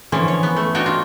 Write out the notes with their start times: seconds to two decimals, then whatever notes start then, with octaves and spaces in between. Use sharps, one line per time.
0.12 D3 E3 F3 C#4
0.28 C#5
0.43 B3
0.56 A3
0.74 D4 F#4 C#5 D#5 G5
0.86 F4